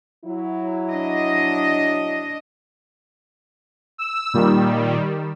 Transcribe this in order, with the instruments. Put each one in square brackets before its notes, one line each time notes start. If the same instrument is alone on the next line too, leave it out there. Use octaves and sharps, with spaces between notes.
[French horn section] F#3 E4
[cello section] D4 D#5
[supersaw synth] E6
[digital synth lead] A#2 [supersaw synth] D#3 G3